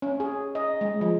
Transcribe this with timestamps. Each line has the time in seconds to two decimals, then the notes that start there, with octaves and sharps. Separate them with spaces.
0.02 C#4
0.20 G#4
0.55 D#5
0.81 G#3
1.01 F3